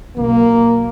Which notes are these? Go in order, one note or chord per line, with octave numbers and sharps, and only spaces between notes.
B1 A#3